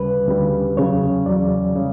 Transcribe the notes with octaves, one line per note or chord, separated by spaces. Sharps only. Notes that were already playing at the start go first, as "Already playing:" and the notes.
Already playing: D2 C#3 G3 B4
D2 C#3 G3
E2 C#3 F#3 C#5
E2 C#3 F#3 D5
C#3 G3